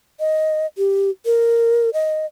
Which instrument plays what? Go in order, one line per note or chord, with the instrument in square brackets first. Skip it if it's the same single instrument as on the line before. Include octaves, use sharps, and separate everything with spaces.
[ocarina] D#5
G4
A#4
D#5